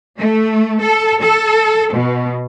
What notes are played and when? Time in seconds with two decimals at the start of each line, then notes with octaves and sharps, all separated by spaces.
0.18 A3
0.81 A4
1.21 A4
1.93 B2